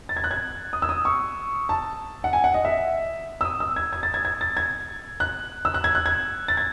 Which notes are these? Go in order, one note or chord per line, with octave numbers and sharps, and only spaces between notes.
A6
G#6
F#6
G#6
D#6
E6
D#6
C#6
A5
F#5
G#5
F#5
D#5
E5
E6
D#6
E6
G#6
G#6
A6
G#6
G#6
A6
G#6
F#6
E6
F#6
G#6
F#6
G#6
A6
G#6